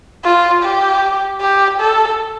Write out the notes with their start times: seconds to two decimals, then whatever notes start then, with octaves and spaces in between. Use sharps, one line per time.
0.24 F4
0.63 G4
1.41 G4
1.80 A4